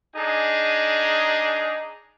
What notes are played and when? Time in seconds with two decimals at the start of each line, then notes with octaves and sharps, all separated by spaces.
0.15 D4 D#4 G#4